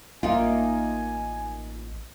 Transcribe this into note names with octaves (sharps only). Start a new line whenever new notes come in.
A1 A#3 D#4 F4 E5 G#5